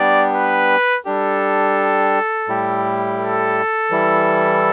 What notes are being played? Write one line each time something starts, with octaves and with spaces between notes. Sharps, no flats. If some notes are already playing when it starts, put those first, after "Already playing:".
Already playing: G3 B3 D4 G4 D5
B4
G3 D4 G4 A4
A2 G3 E4 G4
A4
E3 G3 E4